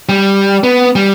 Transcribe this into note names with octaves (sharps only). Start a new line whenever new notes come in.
G3
B3
G3